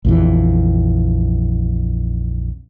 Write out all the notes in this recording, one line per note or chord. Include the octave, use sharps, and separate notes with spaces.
A#1 F2 E3